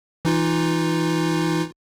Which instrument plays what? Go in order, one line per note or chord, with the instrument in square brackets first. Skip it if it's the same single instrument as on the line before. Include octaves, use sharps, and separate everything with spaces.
[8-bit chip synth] E3 D#4 F4